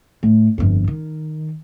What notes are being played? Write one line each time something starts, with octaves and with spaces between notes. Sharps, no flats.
A2
G1 F2
D#3